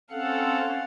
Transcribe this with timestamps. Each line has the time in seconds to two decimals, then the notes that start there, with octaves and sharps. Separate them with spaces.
0.11 C4 C#4 A4 F5 F#5